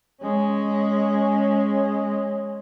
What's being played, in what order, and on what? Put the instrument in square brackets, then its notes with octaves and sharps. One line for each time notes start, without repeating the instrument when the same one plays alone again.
[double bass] G#3 C#4